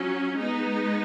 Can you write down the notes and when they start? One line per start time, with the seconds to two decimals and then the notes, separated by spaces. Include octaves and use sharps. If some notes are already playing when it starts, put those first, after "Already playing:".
Already playing: F#3 C#4
0.38 G#3 B3 D#4